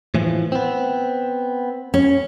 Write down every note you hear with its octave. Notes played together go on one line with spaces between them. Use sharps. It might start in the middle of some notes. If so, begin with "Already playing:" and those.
A2 E3 F3
B3 C4
C#4